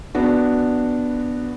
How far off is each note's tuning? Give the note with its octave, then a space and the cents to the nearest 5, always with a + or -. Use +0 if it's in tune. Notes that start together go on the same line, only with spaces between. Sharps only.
B3 +0 D4 +0 F#4 +0